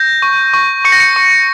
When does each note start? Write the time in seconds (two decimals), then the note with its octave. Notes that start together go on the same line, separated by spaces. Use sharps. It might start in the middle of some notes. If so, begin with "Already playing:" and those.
Already playing: G6 A#6
0.22 C#6
0.54 C#6
0.85 C#6 C#7
0.92 A#6
1.00 C#7
1.16 C#6